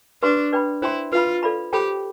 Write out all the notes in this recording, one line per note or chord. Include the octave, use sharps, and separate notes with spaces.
D4 G4 B4 F5 C6
B4 D5 G5 B5
E4 C5 G5 C6
F4 B4 F5 B5
A4 D5 F5 B5
G4 A4 C5 G5 B5